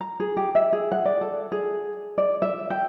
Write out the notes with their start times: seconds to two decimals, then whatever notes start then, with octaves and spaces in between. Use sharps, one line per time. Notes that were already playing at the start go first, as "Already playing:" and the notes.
0.01 A#5
0.20 G#4
0.37 G4
0.55 E5
0.73 G#4
0.92 F#5
1.05 D5
1.21 A4
1.52 G#4
2.18 D5
2.42 E5
2.70 G5